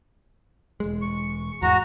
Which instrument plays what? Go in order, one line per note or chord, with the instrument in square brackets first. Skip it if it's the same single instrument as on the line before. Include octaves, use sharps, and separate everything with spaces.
[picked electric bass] E1 G#3
[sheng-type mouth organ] C#6
[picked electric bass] E2 G#2 [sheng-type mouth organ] F#4 A#5